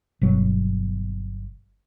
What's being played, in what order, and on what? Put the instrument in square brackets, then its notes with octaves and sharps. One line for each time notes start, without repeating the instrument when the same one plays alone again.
[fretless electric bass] G1 B2 F#3